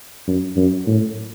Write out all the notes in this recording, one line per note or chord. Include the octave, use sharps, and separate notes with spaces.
F#2
F#2
A2